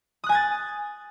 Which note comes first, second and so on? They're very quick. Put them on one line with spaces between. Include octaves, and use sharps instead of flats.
D#6 F#6 G#5 G#6 A6